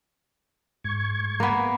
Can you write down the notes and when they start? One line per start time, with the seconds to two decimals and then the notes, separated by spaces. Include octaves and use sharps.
0.84 G#2 C#6 G#6
1.40 A#3 B3